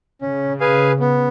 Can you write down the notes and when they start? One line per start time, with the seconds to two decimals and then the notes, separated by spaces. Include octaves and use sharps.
0.21 C#3 C#4
0.60 G#4 B4 F5 G#5
1.00 B3